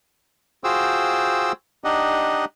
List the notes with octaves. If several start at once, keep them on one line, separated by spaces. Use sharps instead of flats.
F4 F#4 G#4 C5 G5 E6
D4 D#4 G4 D#5 F#5